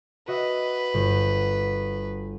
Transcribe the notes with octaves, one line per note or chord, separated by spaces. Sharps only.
F#4 B4 D#5 E5
G1